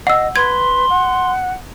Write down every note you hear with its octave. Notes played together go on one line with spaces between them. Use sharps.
D#5 F#5 E6
B4 C6 G#6
F#5